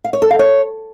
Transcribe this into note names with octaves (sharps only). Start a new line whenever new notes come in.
F5
C#5
A4
F5
C#5